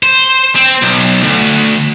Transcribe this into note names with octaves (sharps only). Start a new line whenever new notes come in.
C5
C4
B1
D2